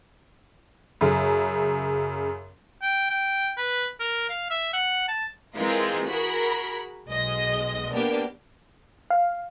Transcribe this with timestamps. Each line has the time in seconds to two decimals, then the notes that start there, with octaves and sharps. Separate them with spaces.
1.01 F#2 C#3
2.83 G5
3.11 G5
3.58 B4
4.00 A#4
4.29 F5
4.51 E5
4.73 F#5
5.08 A5
5.56 E3 G#3 C4 F4 A#4
6.08 F#4 G#4 A#4 B5
7.07 B1 G#3 D#5
7.93 A#3 B3 D4 G4
9.10 F5